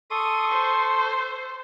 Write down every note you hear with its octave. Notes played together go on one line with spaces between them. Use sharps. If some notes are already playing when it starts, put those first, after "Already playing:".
A4 C6 C#6 D#6
C5